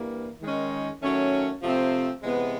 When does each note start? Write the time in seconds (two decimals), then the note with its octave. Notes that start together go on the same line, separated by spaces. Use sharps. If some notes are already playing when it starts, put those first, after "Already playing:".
Already playing: G2 E3 G3 A#3
0.40 D#3 G#3 C#4
1.01 D#3 F#3 A3 C#4
1.62 C3 F3 A3 C4
2.22 C3 E3 G#3 B3